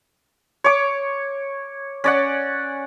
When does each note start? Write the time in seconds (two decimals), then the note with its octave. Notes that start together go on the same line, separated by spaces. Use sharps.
0.64 C#5 D6
2.04 C#4 D5 F#5